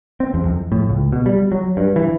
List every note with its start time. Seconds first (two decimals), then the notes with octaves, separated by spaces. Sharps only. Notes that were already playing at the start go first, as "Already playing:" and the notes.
0.20 C4
0.34 E2
0.45 F2
0.72 A2
0.89 C#2
1.12 B2
1.26 G3
1.52 F#3
1.77 G2
1.96 E3